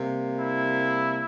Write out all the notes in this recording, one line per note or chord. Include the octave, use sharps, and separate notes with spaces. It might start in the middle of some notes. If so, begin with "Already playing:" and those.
Already playing: C3 G3 A#3
E4